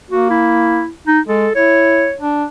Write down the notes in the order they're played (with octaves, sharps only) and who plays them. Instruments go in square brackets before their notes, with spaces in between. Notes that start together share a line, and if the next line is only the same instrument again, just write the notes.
[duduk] A#3 [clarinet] F#4
[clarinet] E4
D#4
[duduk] G#3 [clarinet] A4
[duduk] E4 [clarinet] C#5
[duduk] D4